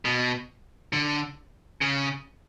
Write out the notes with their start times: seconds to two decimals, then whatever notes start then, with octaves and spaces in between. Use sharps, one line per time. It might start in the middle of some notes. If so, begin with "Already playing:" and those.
0.05 B2
0.93 D3
1.81 C#3